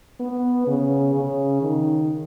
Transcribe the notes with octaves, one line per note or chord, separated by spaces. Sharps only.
B3
C#3
C#3
D#3